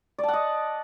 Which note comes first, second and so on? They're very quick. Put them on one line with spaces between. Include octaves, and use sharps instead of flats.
D5 A5 F#5 D#5